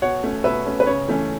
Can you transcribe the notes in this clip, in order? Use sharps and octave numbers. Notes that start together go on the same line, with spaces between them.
B2 C#5 F#5
A3 C#4
B2 B4 E5
A3 C#4
B4
C#3 C#5
E3 A3 C#4